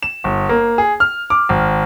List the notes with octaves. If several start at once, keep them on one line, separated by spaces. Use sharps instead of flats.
E7
G1
A#3
G#4
F6
D6
G#1